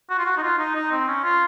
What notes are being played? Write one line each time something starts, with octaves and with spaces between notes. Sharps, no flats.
F#4
F4
F#4
D#4
F4
D#4
D#4
C4
C#4
F4